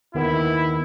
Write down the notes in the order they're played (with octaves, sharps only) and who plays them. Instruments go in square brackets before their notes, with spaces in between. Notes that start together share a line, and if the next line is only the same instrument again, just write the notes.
[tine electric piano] D#2 D#3 B3 [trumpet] E4